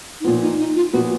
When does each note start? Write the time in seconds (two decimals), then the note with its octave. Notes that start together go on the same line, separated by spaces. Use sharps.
0.21 D#4
0.24 A#2 F3 B3 F4
0.42 D#4
0.59 D#4
0.76 F4
0.93 A#2 F3 B3 F#4